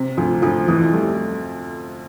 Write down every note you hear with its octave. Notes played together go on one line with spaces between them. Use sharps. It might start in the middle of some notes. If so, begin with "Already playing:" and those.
Already playing: C3
D2 F3
D2 F3
F2 E3
G3 A3